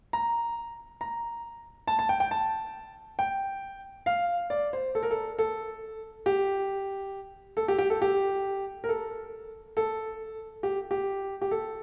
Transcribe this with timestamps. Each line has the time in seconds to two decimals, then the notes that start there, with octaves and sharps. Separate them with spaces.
0.13 A#5
1.01 A#5
1.87 A5
1.99 A5
2.09 G5
2.20 G5
2.31 A5
3.19 G5
4.06 F5
4.50 D5
4.73 C5
4.95 A4
5.03 A#4
5.11 A4
5.39 A4
6.26 G4
7.57 A4
7.68 G4
7.78 G4
7.90 A4
8.02 G4
8.84 A#4
8.89 A4
9.77 A4
10.63 G4
10.91 G4
11.42 G4
11.51 A4